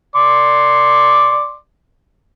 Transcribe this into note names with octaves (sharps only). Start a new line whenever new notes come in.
D5 C6 D6